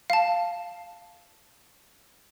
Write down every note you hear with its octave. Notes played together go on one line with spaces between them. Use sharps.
F5 A5